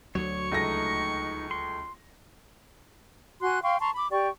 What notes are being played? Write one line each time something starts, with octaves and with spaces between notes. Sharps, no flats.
D2 F#3 C#5 C#6
C#2 A3 D#4 A#6
C6
F#4 G#5 C6 F#6
F5 G5 C6 C#6
A5 A#5 C6 C#6
B5 D6
G4 D5 G5 C#6